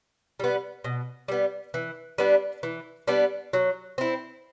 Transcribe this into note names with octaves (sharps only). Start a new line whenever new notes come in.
G3 B3
B2
G3 B3
E3
G3 B3 D4
E3
G3 B3 D4
F#3
C4 E4